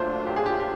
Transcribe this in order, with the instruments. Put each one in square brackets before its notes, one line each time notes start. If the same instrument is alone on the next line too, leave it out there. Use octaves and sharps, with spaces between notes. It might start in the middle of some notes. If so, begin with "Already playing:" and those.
Already playing: [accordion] A#2 F#3 A3 D4 F4 [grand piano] C5
[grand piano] G4
G#4
G4
G4